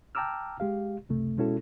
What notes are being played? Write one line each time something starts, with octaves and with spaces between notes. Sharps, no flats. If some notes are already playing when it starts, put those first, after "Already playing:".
G5 A5 A#5 D6 E6 F6
G#3 G4 F5
C#2 F#2 C3 A3
B2 G#3 C#4 E4 F#4 A4